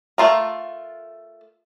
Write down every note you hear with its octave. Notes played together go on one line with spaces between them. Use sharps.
A3 F4 A#4